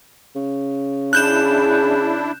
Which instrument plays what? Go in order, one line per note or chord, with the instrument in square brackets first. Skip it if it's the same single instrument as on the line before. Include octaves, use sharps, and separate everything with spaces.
[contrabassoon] C#3
[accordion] D4 E4 [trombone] G#4 [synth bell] F#6 G6 E7